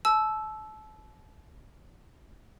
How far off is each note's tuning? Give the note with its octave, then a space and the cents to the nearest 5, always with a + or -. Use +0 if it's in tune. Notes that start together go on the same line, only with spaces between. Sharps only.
A5 -30 E6 +0